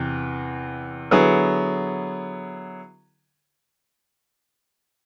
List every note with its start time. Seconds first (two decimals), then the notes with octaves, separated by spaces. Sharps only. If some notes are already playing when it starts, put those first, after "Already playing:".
Already playing: E2 C3
1.11 D3 F#3 B3 E4 G#4